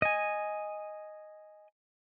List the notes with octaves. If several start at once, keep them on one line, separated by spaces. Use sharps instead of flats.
D#5 G#5